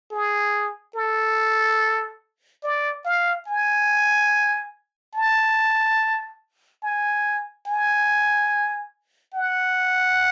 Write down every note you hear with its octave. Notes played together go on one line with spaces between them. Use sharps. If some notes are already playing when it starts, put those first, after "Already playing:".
G#4
A4
D5
F5
G#5
A5
G#5
G#5
F#5